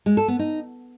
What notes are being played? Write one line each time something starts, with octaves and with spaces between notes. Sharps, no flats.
G#3
A4
B3
D#4